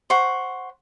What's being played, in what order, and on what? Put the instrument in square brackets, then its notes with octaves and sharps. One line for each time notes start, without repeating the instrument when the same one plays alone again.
[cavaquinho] C5 F#5 C#6